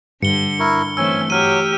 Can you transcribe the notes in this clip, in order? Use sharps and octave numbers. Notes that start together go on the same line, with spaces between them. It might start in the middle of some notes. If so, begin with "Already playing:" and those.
G2 D3 C#7 G7
E4 A#4 C#6
E3 A3 C4 C#4 G#5 E6
F#3 G4 F6 D#7